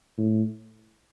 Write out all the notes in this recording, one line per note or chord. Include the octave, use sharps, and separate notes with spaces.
A2